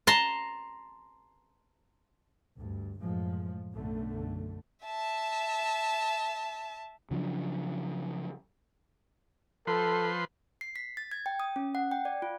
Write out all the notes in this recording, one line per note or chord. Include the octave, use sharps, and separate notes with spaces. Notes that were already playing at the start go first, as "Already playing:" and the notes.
A5 A#5 C6
D2 G2
F#2 A2 F3 G#3
B1 F#2 D3 A3
E5 A5
C#3 F3 F#3 D4
F3 A4 B4 C6
C7
B6
A6
G#6
G5
D#6
C#4
F#5
G5
D5
F4